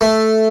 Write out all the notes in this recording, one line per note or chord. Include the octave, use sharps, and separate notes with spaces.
A3